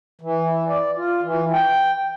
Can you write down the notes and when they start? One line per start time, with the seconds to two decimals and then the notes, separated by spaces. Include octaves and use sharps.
0.21 E3
0.67 D5
0.97 F4
1.23 E3
1.53 G5